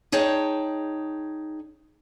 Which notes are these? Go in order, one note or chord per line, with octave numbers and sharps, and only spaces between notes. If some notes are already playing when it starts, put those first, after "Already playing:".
D#4 G#4 C#5 G5 A5